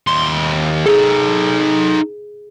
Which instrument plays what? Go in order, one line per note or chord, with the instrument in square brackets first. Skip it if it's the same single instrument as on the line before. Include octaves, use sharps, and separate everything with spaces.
[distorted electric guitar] D#2 C6
[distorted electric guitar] D#4 A4 [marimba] G#4